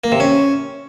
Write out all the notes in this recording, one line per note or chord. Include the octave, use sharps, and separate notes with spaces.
A#3
C3
C#4